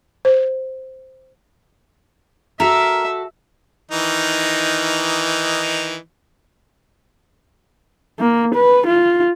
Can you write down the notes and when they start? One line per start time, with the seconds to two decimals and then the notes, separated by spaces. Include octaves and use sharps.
0.25 C5
2.60 F#4 A4 A#4 E5
3.91 D#3 E3 D#4
8.19 A#3
8.55 B4
8.87 F4